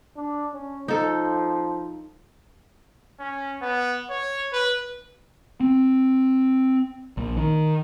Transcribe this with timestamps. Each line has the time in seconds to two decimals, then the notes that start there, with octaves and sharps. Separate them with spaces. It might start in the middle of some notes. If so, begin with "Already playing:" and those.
0.17 D4
0.54 C#4
0.88 F3 D#4 A4
3.20 C#4
3.62 B3
4.10 C#5
4.53 B4
5.61 C4
7.17 A#1
7.37 D#3